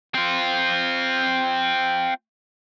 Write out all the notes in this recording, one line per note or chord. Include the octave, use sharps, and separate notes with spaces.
C4 F4